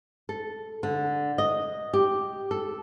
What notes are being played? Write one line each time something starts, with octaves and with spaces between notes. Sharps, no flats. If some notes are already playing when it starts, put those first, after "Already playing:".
A4
D3
D#5
G4
A4